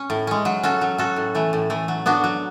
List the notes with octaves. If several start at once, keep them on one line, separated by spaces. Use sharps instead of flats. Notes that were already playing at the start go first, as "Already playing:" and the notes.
Already playing: C#4
A2
G#3 C#4
F#3
C#4 F#4 A4
F#3
C#4 F#4 A4
A2
E3 A3
A2
E3 A3
F#3
B3 D4 F#4
F#3